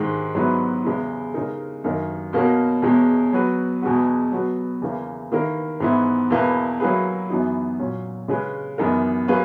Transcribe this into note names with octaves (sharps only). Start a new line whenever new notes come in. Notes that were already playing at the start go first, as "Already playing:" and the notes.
Already playing: G#2 D#3 G#3
G#2 F#3 B3 E4 B4
E2 C#3 G#3 B3 E4
C#3 G#3 D#4 A#4
F#2 D#3 A#3 D#4 A#4
B2 A#3 C#4 F#4 A#4
E2 B2 G#3 C#4
F#3 B3 F#4 B4
E2 B2 G#3 B3 F#4
F#3 B3 F#4 B4
E2 C#3 E3 A#3
D#3 A#3 E4 A#4
G#2 E3 B3 E4
E2 B2 A#3 E4 B4
F#3 A#3 E4 G#4 B4
F#2 E3 B3 D#4 F#4
A#2 F#3 C#4
C#3 G#3 C#4 G#4 B4
F#2 E3 B3 D#4 A#4
F#3 A#3 C#4 G#4 B4